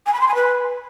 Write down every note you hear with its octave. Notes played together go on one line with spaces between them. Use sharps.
G#5
B5
C6
G#5
B4